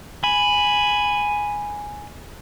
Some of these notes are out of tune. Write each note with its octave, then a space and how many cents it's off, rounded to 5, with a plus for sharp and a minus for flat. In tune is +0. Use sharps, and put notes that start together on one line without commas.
G#5 +0 B5 +0